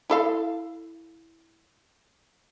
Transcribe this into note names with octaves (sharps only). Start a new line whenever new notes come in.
E4 A4 F5